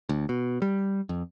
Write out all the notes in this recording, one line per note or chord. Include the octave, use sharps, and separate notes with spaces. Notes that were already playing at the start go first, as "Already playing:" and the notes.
D2
B2
G3
F2